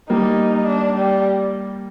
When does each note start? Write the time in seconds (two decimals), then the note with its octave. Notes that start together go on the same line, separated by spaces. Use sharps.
0.09 G3 A#3 D#4
0.67 D4
0.96 G3